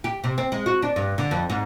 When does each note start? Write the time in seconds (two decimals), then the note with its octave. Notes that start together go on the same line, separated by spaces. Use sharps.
0.04 G4
0.24 C3
0.38 C4
0.52 G#3
0.66 F#4
0.82 D4
0.96 G2
1.18 D3
1.31 F2
1.50 G#2